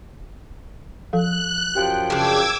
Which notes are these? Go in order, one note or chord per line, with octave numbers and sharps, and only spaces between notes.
F3 A4 F5 F#6
F#2 F3 G4 G5
C#3 D4 D6 E6 G#6